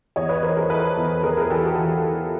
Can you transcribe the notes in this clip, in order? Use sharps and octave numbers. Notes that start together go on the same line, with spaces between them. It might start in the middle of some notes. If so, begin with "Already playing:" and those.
E2 C#5 D#5
B4 C#5
E3 A#4 C5
G#4 A#4
E3 A4 B4
E2
E2 G#4 A#4
G#4 A#4
E3 G4 A4
F#4 G#4
E3 F4 G4
E3